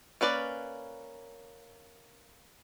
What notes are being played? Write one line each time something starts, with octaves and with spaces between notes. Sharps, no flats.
A#3 C#4 B4 D5